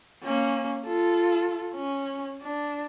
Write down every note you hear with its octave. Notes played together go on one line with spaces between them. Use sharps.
A#3 C#4
F4 A4
C#4
D4